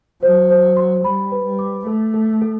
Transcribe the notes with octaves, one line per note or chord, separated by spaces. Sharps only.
F#3 C5
C5
C6
G3 B5
B4
G3
D6
A3 A4
A4
A4